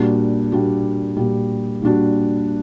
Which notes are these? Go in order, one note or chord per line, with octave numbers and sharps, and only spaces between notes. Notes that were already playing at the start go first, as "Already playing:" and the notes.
Already playing: A#2 G3 D4 F#4
A#2 G3 D4 F#4
A#2 G3 D4 F#4
A#2 G3 D4 F#4